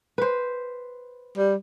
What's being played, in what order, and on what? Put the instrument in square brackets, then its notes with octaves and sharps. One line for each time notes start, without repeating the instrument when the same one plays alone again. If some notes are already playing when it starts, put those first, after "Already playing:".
[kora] B4 C5
[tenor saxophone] G3